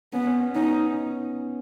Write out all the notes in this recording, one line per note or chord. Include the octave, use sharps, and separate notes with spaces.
B3 C#4
C#4
B3
C#4 D#4